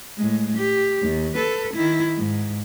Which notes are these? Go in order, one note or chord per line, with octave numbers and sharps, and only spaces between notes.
A2 G#3
G4
D#2
A4 B4
D#3 E4
G#2